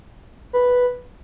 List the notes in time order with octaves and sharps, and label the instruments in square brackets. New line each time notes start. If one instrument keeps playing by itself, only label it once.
[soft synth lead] B4